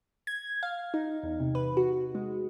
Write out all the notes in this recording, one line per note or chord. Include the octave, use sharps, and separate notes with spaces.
G#6
F5
D#4
E2
C3
B4
F#4
G#3